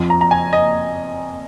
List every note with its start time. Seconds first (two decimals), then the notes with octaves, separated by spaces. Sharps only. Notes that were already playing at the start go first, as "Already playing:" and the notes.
Already playing: F2 F3
0.10 A#5
0.21 A#5
0.31 G#5
0.53 D#5